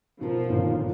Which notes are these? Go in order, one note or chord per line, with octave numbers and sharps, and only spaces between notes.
B2 F3 A#4
G1 A#2 D#3